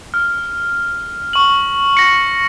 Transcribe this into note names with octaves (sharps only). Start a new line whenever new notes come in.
F6
C#6 F#7
A#6 C#7